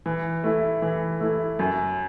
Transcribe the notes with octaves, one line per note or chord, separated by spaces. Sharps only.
E3
A3 E4
E3
A3 E4
F#2